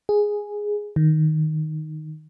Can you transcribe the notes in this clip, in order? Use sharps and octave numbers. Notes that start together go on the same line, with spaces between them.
G#4
D#3